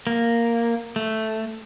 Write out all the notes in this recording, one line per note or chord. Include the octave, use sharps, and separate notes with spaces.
A#3
A3